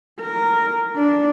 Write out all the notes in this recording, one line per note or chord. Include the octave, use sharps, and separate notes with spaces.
A#4
D4